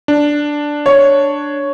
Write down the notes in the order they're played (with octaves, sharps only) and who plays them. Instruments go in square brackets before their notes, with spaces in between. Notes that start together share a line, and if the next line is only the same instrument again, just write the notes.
[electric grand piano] D4
[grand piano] C#5